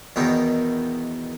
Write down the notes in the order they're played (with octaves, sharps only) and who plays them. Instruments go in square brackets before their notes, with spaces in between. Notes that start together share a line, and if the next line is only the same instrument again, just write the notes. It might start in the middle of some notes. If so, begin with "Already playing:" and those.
[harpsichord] E2 B2 D#3